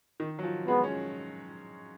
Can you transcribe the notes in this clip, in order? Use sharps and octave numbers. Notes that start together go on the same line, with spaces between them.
D#3
F#3
F3
G#3 B3
C#4